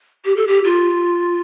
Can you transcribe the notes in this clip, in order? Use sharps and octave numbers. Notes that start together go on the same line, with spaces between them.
G4
A4
G4
F4